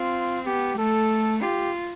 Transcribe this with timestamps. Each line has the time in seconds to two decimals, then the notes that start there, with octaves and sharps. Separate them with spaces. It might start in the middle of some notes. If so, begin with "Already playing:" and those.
Already playing: C4 F4
0.46 B3 G4
0.78 A3 A4
1.42 F4 G4